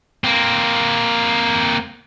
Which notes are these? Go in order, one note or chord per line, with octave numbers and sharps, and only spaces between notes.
A#3 C4